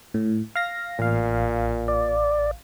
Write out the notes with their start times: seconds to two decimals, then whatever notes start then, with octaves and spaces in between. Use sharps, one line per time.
0.14 A2
0.55 F5 A#6
0.99 A1 A#2 F5
1.88 D5